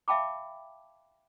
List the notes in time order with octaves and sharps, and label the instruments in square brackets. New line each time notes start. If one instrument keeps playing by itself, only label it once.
[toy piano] E5 F5 G5 A5 B5 D6